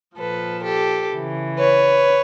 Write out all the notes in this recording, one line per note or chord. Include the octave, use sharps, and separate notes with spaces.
A#2 F3 A4 B4
G4 A4
C#3 E3
B4 C#5